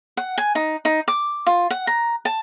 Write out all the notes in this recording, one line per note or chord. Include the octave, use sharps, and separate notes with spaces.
F#5
G#5
D#4
D#4
D6
F4
F#5
A#5
A5